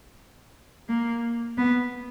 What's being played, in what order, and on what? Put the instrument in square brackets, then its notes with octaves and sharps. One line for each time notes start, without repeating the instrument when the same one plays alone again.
[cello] A#3
B3